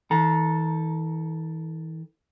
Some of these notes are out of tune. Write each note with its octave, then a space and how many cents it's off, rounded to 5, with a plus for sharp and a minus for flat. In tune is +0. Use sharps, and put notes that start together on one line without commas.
E3 -45 A4 +0 A#5 +30